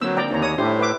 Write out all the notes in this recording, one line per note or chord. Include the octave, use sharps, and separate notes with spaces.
D3 F#3 A#3 C4 E6
D5 G5 A#5
D#2 D#4 C#5 A#5
C#5 D#6
A2 D4 E4 G4 C5
B4 E5 D6